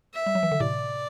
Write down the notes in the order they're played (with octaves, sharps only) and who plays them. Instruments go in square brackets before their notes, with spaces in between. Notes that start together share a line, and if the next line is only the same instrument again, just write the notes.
[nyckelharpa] E5
[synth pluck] G3
F#3
E3
D3
[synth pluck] A2 C3 [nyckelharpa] D5